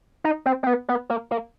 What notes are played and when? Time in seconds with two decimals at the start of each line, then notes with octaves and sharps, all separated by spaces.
0.24 D#4
0.46 C4
0.63 C4
0.67 B3
0.89 B3
1.10 A#3
1.31 A#3